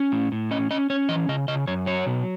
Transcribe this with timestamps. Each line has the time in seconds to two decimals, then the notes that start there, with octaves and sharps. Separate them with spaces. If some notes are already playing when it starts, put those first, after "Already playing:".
Already playing: C#4
0.12 A2
0.32 A2
0.51 C#4 D#5
0.71 C#4 D#5
0.90 C#4 C#5
1.09 E3 D#5
1.29 C#3 D#5
1.48 C#3 D#5
1.67 F#2 C#5
1.86 F#3 C#5
2.06 B2